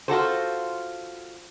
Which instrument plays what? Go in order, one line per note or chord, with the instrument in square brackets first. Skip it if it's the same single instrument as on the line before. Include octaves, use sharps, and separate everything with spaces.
[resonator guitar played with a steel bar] F4 F#4 A4 C5